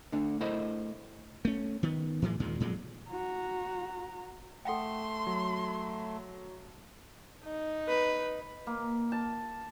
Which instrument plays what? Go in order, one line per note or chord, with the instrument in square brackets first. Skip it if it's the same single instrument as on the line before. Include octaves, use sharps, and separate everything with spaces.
[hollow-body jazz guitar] D3 A3 D4
A3 E4 A#4 C5 D#5 E5
[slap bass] A3 C#4
D#3 B3
A2 E3 F#3 G#3
D#2 A#2 D#3 G#3
F2 A#2 F#3 G#3
[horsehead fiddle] F#4 A#5
[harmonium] A3 [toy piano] A4 F#5 G5 [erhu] C6
[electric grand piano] F#3
[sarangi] D#4
[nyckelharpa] B4
[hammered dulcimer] A#3
A5